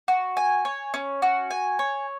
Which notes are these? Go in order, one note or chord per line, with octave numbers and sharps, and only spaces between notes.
F#4
G#5
C#5
C#4
F#4
G#5
C#5